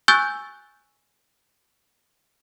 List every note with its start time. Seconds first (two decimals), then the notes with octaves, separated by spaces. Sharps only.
0.08 G#5 C#6 E6 F#6 G6 A6